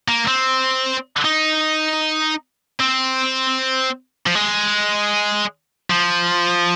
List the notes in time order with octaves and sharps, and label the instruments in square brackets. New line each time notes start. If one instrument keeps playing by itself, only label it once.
[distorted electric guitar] A#3
C4
D#4
C4
F3
G#3
F3